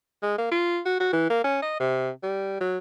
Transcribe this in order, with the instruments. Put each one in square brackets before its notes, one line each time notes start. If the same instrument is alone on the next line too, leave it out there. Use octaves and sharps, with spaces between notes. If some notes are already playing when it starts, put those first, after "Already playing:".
[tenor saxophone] G#3
A#3
F4
F#4
F#4
E3
A#3
C#4
D#5
C3
G3
F#3